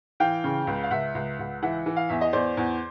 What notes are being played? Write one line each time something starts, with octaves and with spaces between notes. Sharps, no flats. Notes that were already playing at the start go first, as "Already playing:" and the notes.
E3 F5 G5
C#3
C#2
F5
C#2 E5 F#5
C#2
C#2
E3 E5 F#5
E3
F5
E2 E5
D#5
E2 C5 D5
E2